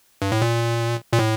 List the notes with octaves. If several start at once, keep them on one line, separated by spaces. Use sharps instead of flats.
G2
A2
A#2
A#2
A2